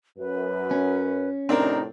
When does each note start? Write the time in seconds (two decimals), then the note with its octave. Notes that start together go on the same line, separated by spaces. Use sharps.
0.18 F#2 B4
0.71 C#4
1.49 F2 A2 C3 C4 D4 D#4 A#4